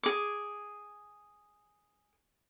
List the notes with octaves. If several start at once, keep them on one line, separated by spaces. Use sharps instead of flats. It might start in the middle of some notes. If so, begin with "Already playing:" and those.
G#4 D6